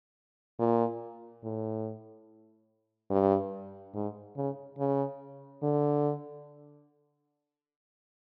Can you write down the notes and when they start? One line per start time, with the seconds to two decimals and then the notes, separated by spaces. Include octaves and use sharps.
0.59 A#2
1.44 A2
3.11 G2
3.94 G#2
4.37 C#3
4.79 C#3
5.63 D3